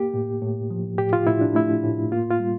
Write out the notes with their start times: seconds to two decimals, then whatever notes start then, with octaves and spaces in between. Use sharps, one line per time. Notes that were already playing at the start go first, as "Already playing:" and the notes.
Already playing: A#3 G4
0.14 A2
0.42 A2
0.70 F3
0.98 A2 G4
1.13 F4
1.27 A2 E4
1.41 D4
1.55 A3 E4
1.84 A2
2.12 A#3 F4
2.31 F4
2.40 G3